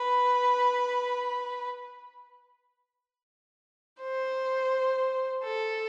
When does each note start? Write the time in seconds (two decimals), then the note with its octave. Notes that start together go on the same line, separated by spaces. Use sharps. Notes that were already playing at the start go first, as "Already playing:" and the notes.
Already playing: B4
4.01 C5
5.43 A4